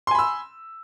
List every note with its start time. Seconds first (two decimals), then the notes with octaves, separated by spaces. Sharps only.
0.07 C6
0.11 G#5
0.15 B5
0.19 E6